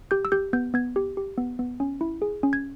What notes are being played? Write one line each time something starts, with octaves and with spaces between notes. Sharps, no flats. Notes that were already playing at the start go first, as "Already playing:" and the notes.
G4 G6
E6
G4 G6
B3 G6
B3 G#6
G4
G4
B3
B3
C#4
E4
G#4
C#4
G#6